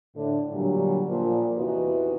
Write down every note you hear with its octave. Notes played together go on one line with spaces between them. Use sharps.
A2 D3
A#2 D3 F#3 G3
A#2 F3
E2 C3 E3 D#4 F#4 B4